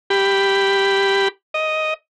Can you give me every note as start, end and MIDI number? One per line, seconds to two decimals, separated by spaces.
0.10 1.28 67
0.10 1.28 83
1.54 1.94 75